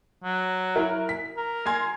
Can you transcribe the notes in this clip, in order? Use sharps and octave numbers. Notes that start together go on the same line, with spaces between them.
F#3
E4 A#4
B6
A#4
G#5 C6 G#6